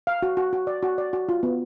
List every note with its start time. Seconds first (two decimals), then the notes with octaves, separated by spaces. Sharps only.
0.07 F5
0.22 F#4
0.37 F#4
0.53 F#4
0.67 D5
0.83 F#4
0.98 D5
1.13 F#4
1.29 F4
1.43 B3